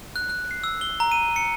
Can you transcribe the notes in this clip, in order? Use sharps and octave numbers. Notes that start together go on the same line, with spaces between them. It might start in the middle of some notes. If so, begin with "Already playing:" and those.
F#6
F#6
C7
E6
G7
A#5
D#7
C#7